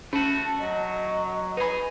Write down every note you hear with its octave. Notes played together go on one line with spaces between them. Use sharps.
A3 C#4 F#4 A5
F#3 D#5
D#4 G#4 B4 B5